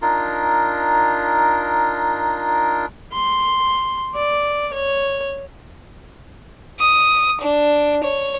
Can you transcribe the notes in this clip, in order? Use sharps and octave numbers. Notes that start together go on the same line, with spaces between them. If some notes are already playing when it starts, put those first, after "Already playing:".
D4 D#4 F4 A#4
C6
D5
C#5
D#6
D4
C#5